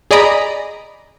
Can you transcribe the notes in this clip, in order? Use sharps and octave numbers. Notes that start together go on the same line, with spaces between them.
G#4 D5 D#5 A#5 B5